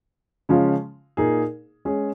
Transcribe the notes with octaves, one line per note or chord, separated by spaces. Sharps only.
C#3 F3 G#3 C#4 F4
A#2 A#3 D#4 G#4
G#3 C#4 G#4